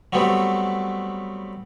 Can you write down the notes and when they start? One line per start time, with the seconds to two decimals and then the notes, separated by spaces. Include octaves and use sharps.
0.13 F#3 G3 A3 B3 C4